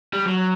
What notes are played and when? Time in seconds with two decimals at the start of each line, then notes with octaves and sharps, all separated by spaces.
0.13 G3
0.25 F#3